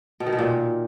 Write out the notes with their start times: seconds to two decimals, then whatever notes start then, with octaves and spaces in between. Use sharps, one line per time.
0.20 B2
0.26 D#3
0.32 B2
0.39 A#2